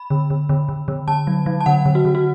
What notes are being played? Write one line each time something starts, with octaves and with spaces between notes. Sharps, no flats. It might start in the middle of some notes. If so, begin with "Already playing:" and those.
Already playing: B5
D3
D3
D3
D3
D3
D3 A5
F#3
F#3
A5
D3 F#5
D3
F#4
D3
F#4